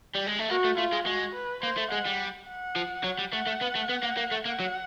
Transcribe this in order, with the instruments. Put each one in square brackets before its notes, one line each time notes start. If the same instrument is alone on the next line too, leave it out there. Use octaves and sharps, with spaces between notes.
[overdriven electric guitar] G3
G#3
A3
[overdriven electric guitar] A#3 [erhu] F#4
[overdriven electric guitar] A3
[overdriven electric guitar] A3 [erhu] F4
[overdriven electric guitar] G#3
[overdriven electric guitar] G#3 [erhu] F#4
[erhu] B4
[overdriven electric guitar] A#3 [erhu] C5
[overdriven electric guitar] A3
[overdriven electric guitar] G#3 [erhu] F#5
[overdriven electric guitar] G3
[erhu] F#5
[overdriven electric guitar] F3
F#3
G3
[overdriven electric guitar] A3 [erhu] F#5
[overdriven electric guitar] A3
B3
A3
B3
A#3
A#3
A3
[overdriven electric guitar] A#3 [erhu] F#5
[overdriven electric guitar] F#3